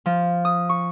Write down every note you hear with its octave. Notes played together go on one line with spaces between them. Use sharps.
F3
D#6
C#6